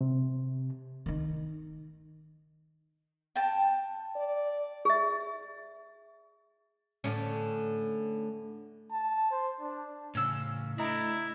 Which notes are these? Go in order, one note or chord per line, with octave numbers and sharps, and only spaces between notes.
C3
D#3 D#4
G5 A5
D5
G#4 E5
A2 D3 C#4
A5
C5
D4
A2 C#3 C#4 E6
A3 D4 E4 D#5 A#5